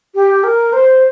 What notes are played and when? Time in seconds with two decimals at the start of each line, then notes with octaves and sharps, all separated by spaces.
0.15 G4
0.44 A#4
0.73 C5